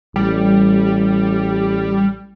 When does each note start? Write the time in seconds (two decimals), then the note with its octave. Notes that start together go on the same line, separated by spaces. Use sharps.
0.16 A1 G3